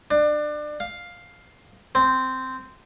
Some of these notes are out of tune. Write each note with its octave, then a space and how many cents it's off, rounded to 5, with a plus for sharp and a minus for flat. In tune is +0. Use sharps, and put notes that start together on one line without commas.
D4 +30
F5 +5
C4 -10